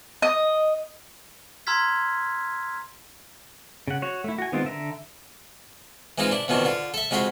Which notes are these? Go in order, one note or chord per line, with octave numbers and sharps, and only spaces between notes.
D#5
A#5 C6 E6 F6 G#6 B6
C#3 F#5
F#4 C#5
A3 E4
F#4 G#5
D#3 G#3 B3 C4 F4
D3 E5 A#5
E3 G#3 C4 D#4 F4
D4 E4
F2 B2 D#3 E3 D4
D3 F4
A4 E5
F2 G#3 F#4 B5 C6